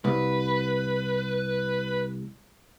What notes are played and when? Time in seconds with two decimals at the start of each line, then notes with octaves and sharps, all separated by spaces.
0.05 C2 B4